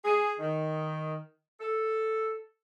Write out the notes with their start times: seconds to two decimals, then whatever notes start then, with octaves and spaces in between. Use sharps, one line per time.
0.05 G#4
0.40 D#3
1.60 A4